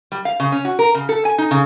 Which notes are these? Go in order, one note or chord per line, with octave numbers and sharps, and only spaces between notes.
G3
F5
C#3
C#4
F#4
A#4
C#3
A4
G#5
D#4
C#3